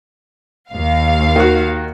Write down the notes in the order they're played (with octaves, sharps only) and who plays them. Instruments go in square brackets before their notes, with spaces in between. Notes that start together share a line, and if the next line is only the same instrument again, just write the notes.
[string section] D#2 F5
[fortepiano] D#3 F#4